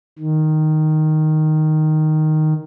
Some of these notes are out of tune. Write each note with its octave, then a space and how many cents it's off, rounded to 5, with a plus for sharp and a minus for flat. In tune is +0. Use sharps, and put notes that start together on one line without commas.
D#3 -5